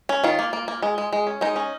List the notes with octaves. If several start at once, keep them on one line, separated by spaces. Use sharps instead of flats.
C#4
D#3 F4
A#3
A#3
A#3
G#3
G#3
G#3
C#4
G#3 D#4
C#4